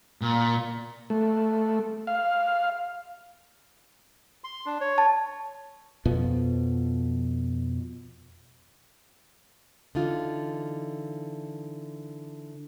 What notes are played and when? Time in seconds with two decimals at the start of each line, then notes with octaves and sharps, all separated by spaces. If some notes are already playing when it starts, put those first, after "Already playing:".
0.21 A#2
1.10 A3
2.07 F5
4.44 C6
4.66 D4
4.81 C#5
4.98 A5
6.05 F2 B2 F3
9.95 D3 E3 D#4 F4